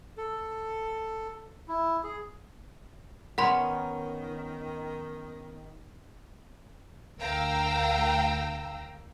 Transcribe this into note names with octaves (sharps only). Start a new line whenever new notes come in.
A4
E4
G#4
D#3 B3 C#4 A#4 F#5 B5 C6
D2 A#4 F5 G5 A#5 E6